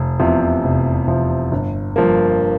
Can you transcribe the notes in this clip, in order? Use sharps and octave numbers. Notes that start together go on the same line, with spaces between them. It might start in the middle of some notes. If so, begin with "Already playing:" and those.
Already playing: F1
E2 C3 F3
F1
E2 C3 F3
G1
G2 F3 A#3